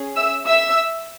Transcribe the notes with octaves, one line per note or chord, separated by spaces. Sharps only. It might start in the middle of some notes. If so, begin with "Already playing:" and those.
Already playing: C#4 G#4
E5 E6
E5 E6